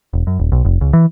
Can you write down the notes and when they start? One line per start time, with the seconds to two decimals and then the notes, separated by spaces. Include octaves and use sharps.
0.13 E1
0.27 F#2
0.39 D#1
0.52 B1
0.65 F1
0.81 C#2
0.93 E3